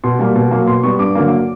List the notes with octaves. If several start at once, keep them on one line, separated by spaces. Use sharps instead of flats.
B2 C6
G3 A#3
B2
F#3 A#3
B2 C6
G3 B3 C#6
G2 D6
D3 F#3 A#3